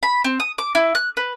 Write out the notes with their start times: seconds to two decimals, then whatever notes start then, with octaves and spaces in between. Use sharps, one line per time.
0.03 B5
0.24 C4
0.40 D#6
0.58 D6
0.75 E4
0.95 F#6
1.17 B4